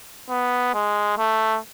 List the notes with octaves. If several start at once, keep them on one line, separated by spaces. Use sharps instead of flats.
B3
G#3
A3